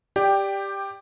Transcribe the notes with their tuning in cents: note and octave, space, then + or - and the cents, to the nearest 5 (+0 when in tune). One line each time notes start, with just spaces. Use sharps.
G4 +10 D5 +0 G5 +0